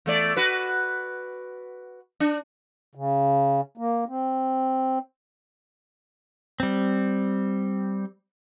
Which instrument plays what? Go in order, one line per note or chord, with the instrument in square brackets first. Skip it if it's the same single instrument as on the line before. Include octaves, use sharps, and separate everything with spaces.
[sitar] E2 A3 D5
F#4 B4
D4
[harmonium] C#3
A#3
C4
[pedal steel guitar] G3 C4